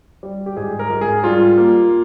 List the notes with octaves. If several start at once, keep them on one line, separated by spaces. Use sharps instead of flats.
G3
G4
G#2 G#4
A#4
G#2
G#4
G3 F4
A#3